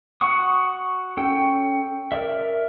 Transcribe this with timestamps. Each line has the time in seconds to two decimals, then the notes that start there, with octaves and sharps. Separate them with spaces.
0.21 F#4 F#5 C#6 D#6
1.17 C#4 A4 G5
2.12 A#4 D5 E5